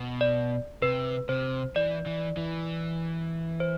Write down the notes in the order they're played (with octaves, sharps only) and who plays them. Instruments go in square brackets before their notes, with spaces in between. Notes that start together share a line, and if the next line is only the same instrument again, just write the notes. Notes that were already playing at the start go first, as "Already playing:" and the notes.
Already playing: [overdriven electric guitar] B2
[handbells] D5
[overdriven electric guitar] C3 [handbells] B4
[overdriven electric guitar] C3 [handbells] C5
[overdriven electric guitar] E3 [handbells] D5
[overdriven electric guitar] E3
E3
[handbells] C5